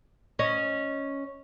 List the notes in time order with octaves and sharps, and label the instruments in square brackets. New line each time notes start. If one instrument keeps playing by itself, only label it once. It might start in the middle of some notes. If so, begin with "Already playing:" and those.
[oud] C#4 D#5